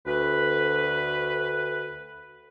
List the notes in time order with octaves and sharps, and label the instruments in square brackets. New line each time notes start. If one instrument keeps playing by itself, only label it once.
[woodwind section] D2 B4